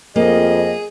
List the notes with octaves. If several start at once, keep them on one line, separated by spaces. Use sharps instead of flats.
F2 A#3 G#4 D#5